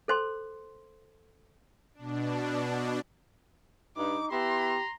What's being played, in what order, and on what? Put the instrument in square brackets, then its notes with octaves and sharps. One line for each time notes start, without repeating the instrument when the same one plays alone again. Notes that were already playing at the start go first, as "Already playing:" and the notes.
[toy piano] A4 C5 C6
[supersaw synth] B2 D4
[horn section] G2 [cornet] D#4 [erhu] D6
[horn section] B3 E4 [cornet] G4 [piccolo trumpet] A#5 [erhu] C6